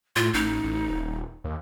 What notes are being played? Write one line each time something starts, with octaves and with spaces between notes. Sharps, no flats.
A2 F4
A1 D#4
A1
D#1
D#2